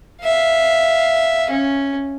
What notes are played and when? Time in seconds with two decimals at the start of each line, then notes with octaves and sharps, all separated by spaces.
0.23 E5 F5
1.50 C#4